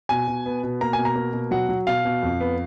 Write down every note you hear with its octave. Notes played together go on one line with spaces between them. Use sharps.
B2 G#5
B2
B3
B2
A#3 A#5
G#5
B2
A#5
A#3
B2
F#3 F#5
F#3
B2 F5
B2
F2
B3